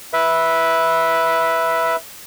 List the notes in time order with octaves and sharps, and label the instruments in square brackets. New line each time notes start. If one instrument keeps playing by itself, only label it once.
[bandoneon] B4 E5